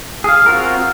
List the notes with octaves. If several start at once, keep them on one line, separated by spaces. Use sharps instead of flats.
G#4 F5
C4 F4 F#4 A#4